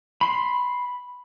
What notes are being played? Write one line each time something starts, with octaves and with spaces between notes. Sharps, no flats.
B5 C6